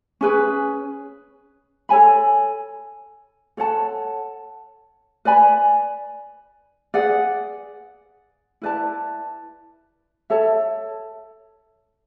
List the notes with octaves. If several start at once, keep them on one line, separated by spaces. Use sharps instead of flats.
C#4 G#4 B4
A4 C#5 G#5 B5
A4 C#5 F#5 A5
B4 D5 G#5 B5
G#4 B4 D5 F#5
E4 B4 D5 A5
A4 C#5 E5 A5